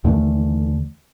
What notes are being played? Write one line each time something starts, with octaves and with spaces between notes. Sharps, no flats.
D#2 D3 E3 A3